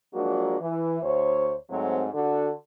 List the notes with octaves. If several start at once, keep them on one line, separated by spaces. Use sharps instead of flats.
F3 F#3 G#3 A#3 D4 F#4
E3
D2 C5 C#5
G#2 F#3 A3 C4
D3 D4 F#4 A4